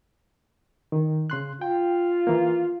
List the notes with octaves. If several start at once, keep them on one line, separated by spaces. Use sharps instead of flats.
D#3
C#3 C6 F#6
F4 G5
E3 A#3